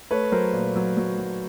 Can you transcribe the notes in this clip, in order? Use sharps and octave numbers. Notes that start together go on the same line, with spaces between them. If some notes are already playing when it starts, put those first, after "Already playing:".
A3 B4 C#5
F#3 A#4 C5
A#2
F#3
F#3
F#3